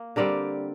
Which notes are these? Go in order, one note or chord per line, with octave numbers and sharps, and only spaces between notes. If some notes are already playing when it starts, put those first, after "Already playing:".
Already playing: A#3
D3 G3 C4 A#4 D5